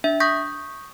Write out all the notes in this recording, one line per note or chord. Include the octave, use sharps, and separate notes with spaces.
D4 E5
C#6 D#6 G6 A#6 B6